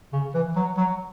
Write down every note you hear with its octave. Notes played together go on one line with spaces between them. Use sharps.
C#3
E3
F#3
F#3